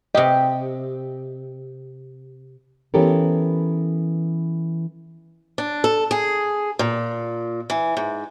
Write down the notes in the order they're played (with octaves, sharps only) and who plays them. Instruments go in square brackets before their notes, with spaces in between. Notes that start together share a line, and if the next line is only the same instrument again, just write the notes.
[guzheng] C3 G4 [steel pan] D#5
[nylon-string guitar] E3 B3 C#4 G4 A4 A#4
[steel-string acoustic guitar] D4
A4
G#4
A#2
E3
G#2